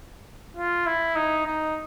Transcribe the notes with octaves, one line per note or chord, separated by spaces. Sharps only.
F4
E4
D#4
D#4